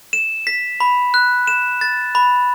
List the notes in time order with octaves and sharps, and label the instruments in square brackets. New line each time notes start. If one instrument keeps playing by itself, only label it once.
[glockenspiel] E7
B6
B5
F#6
E7
A6
B5